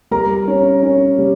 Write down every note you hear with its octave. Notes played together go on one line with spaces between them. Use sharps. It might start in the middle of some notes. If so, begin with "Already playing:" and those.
G3 A#4 A#5
C#4
C#4
G3